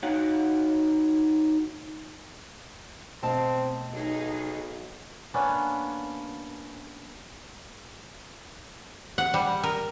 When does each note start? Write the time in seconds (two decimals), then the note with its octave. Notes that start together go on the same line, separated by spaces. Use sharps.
0.03 D#4 F#4 C#5 F5 F#5
3.23 B2 A3 C4 D#5 F5 A5
3.93 B1 D#4 G#4
5.34 A#3 B3 C#4 D4
9.18 F#5
9.34 G3
9.63 A#4